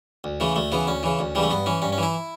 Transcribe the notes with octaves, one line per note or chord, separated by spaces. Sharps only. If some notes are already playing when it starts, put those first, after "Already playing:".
D2
C#3 E3 A3
D2 A3
C#3 E3 B3
D2 C#4
C#3 E3
D2
C#3 E3 G3 A3
G2 B3
E3 C#4
G2 C#4
C#4
E3
E4